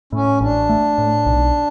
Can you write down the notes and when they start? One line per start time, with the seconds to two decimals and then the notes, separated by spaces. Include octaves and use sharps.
0.12 A2 C#4
0.41 A1 D4
0.69 A3
0.98 A2
1.26 B1